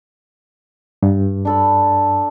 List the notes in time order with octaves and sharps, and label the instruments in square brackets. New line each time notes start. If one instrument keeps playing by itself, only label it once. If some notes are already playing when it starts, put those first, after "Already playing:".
[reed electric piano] G2
[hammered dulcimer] D4 A4 B5